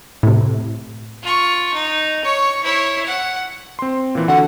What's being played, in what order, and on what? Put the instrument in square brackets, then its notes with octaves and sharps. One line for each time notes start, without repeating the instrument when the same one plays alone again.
[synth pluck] A2 C3
[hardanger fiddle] F4 C#6
D#4
C#5 C#6
E4 C#5
F#5
[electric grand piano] C4 C6
A#2 E3
[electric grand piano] D3 F#4 [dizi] F#5